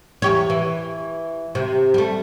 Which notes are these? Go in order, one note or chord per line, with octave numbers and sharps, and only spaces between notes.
E2 G4 C#5
E3
C3
G3 A3